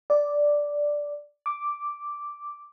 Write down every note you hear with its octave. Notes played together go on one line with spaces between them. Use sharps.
D5
D6